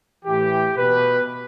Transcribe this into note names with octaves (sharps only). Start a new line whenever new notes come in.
A2 E3 G4
B2 B4